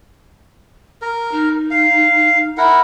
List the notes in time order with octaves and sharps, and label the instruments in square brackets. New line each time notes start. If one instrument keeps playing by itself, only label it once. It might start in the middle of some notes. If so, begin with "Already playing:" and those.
[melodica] A#4 [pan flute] F6
[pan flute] D#4
[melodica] F5
E4 A#4 F#5